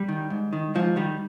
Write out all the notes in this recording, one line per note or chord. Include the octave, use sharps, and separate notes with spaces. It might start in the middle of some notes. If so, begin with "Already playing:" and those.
Already playing: G3
D#3
G#2
D#3
G#2 F3
D#3 G3